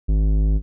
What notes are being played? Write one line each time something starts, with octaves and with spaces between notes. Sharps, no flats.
G#1